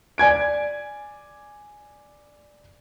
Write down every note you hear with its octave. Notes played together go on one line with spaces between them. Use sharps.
D5 G#5 G#6 D7